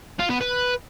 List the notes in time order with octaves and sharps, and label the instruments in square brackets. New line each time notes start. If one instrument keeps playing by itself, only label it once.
[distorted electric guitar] F4
B3
B4